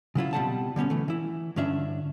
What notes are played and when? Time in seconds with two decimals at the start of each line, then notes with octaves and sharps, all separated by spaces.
0.15 C#3 F#3 E4 F4
0.33 B2 G3 C4 F#5 A5
0.76 D3 G3 B3 C#4
0.90 E3 A3
1.08 E3 E4
1.56 G2 D3 C#4 D4 E5